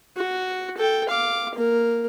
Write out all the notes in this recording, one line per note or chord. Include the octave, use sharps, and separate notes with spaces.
F#4
A4 G5
F5 D6
A#3 A#4